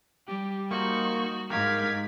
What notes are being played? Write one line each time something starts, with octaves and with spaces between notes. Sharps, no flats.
G3 G4
A#3 D#4 F#4 C5 C#6
G#2 G4 A#4 F5 G#6 B6